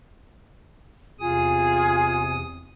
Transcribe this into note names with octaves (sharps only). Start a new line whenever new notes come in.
E2 C3 F4 G#4 D#6